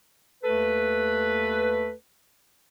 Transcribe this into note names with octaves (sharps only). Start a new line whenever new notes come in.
D#2 A3 A4 B4